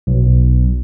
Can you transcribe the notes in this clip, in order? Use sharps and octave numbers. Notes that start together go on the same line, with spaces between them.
B1